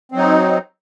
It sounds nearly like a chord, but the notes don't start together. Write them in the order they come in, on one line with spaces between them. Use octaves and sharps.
C4 F#3 D#4